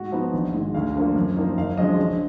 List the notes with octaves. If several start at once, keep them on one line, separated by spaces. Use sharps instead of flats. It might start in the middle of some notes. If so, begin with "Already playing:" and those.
Already playing: G#2 F#4
F3 B3 D#4
A#1
G#2 D#3 F#3
D2 F5
D3 F3 A#3
F#2
F3 A#3 D#4
F#1 F5
F#2 D3 F3 G#3 D#5
A#1